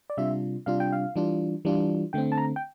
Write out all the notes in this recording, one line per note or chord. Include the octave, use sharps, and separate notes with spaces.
D5
C3 G3 D4 F4 E5
C3 G3 D4 F4 F5
G5
F5
E3 G3 D4 F4
E3 G3 D4 F4
D3 A3 C4 G5
A5
A#5
G5